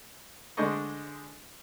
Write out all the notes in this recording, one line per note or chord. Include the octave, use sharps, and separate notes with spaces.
D3 G#3 D4 C5 D#5 C#6